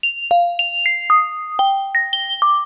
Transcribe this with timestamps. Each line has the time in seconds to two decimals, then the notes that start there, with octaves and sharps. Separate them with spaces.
0.03 F7
0.31 F5
0.59 F7
0.86 C7
1.10 D#6
1.59 G5
1.95 A#6
2.13 G7
2.42 D6